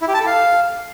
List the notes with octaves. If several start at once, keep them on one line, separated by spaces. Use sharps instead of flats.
E4
G4
A5
A4
F5